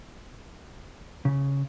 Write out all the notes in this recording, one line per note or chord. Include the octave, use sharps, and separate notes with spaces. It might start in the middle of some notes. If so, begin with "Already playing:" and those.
C#3